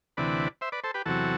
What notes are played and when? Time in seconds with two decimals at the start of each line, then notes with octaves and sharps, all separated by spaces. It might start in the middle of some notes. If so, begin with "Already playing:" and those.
0.17 D2 C3 E3 B4 D5
0.61 C5 E5
0.72 B4 D5
0.83 A4 C5
0.94 G4 B4
1.06 E2 C3 F#3 F#4 A4